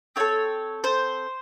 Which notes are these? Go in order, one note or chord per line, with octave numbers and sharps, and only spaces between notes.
C4 F4 A4 C#5
C5